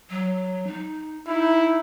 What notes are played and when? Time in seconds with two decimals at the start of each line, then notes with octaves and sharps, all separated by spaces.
0.10 F#3
0.67 D#4
1.27 D#4 E4